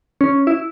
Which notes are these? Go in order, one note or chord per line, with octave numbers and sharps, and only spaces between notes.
C#4
E4